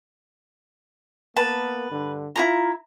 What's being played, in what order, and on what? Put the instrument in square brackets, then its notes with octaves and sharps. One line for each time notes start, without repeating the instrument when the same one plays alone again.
[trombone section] A#3 B3 A#4 [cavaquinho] B4 A5
[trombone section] G2 D3
[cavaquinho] E4 G#4 A#5 [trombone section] F4